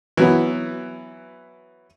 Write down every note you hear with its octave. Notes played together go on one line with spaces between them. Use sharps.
E3 F#3 B3